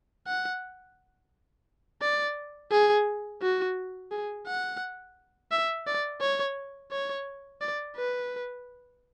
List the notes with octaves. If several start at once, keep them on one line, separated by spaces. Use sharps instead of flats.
F#5
D5
G#4
F#4
G#4
F#5
E5
D5
C#5
C#5
D5
B4